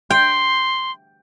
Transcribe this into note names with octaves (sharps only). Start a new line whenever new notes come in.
G5 C6